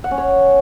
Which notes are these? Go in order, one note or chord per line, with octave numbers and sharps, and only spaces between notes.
F#5
C#4
C#5